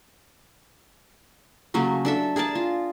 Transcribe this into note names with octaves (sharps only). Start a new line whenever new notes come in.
C#3 F#3 A3 A#3
D4 A4 E5
G#4 A#4 D5 A5
F4